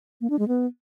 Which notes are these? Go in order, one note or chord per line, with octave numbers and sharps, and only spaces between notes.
A#3
D4
G#3
B3